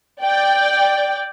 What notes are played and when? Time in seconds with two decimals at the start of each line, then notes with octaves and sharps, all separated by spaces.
0.21 D5 G5